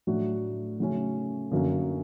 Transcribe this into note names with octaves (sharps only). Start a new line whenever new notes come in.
A2 F#3 A3 D4 F#4
C#3 F#3 A3 C#4
F#2 D3 F#3 A#3